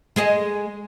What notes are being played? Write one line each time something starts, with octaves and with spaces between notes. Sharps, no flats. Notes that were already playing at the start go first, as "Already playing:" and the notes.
G#3 G#4 D#5